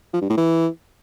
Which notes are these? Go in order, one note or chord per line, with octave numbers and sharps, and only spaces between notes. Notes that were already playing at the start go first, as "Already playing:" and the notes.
F3
G2
A2
E3